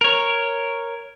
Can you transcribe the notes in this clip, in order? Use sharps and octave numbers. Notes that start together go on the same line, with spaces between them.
A#4 C#5